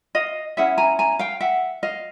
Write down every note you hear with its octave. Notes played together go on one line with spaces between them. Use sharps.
D#5 F5
C#4 E4 G#4 E5 F#5
G#5 A#5
G#5 A#5
F5 G5
E5 F#5
D#5 F5